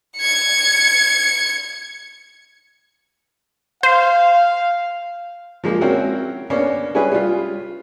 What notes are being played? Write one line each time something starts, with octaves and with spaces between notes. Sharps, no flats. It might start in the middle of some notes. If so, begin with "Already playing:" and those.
G#6 C#7
C5 F5
F3 G#3 A#3
C4 C#4 E4 F#4 A#4
A#3 B3 C#4 D4
G3 C#4 E4 G#4 B4
G3 F4